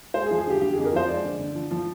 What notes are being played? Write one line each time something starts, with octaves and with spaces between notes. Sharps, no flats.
G#3 C5
G#4
F3
G#4
D3 G4
D3 G4
F2 G#4
A#4
F3 C5
G#3 D5
D3
D3
F3
F3